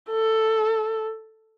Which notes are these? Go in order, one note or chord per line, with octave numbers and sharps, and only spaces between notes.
A4